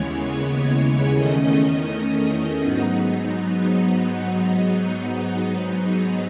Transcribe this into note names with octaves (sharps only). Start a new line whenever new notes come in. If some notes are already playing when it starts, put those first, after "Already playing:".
Already playing: D#2 C#3 E3 G#3 B3 C#5
E2 D#3 A3 C#4 D#5
G#2 F#3 B3 D#4